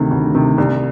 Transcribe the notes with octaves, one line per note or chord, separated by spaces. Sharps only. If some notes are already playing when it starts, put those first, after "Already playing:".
Already playing: D2 C3 D#3
D2
C3 D#3
C2